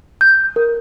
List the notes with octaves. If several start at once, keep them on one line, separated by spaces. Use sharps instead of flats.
G6
A#4